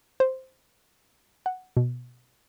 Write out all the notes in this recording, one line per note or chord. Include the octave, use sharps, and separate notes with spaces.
C5
F#5
B2